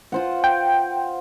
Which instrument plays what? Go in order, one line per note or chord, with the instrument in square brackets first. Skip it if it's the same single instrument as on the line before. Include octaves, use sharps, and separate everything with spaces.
[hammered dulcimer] F4 C5 F#5
[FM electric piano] G5